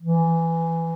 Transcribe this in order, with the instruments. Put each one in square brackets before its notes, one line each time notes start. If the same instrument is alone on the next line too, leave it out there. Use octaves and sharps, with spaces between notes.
[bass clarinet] E3